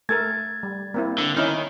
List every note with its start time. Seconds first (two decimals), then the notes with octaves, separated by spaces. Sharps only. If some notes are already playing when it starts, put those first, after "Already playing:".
0.09 A3 A4 A#4 G#6 A6
0.63 G3
0.94 A#3 C4 E4
1.18 D3
1.37 D#3 C#4 D#4 E4